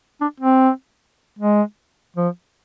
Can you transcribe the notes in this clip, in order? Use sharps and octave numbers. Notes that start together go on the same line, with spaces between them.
D4
C4
G#3
F3